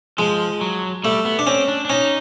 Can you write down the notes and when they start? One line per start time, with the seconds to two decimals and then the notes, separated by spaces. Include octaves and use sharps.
0.18 F3 G#3
0.61 F#3
1.04 G3 A3
1.25 B3
1.39 D4
1.47 C4 C#4
1.68 D4
1.85 D4
1.89 C#4 D#4